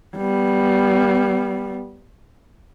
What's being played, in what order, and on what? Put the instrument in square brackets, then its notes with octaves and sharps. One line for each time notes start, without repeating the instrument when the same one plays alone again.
[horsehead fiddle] G3 B3